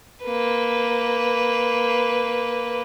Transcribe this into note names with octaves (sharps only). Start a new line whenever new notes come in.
A#3 B4